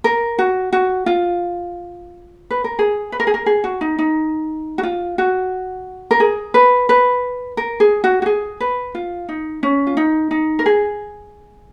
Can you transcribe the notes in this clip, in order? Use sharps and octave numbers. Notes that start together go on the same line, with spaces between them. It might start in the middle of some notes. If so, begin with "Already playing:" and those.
A#4
F#4
F#4
F4
B4
A#4
G#4
B4
A#4
G#4
A#4
G#4
F#4
D#4
D#4
F#4
F4
F#4
A#4
G#4
B4
B4
A#4
G#4
F#4
F#4
G#4
B4
F4
D#4
C#4
F4
D#4
D#4
A#4
G#4